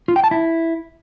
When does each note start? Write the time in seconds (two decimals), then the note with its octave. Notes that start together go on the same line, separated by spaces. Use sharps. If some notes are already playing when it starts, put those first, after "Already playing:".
0.08 F4
0.16 G5
0.24 A5
0.31 E4